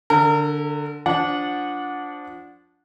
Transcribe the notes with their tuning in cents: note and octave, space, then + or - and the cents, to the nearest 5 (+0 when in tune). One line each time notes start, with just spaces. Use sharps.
D3 +0 A#4 -30
F3 +0 D4 -20 F#5 -15